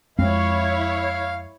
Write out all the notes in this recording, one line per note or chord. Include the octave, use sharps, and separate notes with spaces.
F2 G#3 C4 E4 C#5 F5